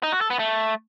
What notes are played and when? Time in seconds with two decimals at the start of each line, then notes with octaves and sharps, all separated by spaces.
0.03 D#4
0.12 F#4
0.21 A4
0.30 B3
0.39 A3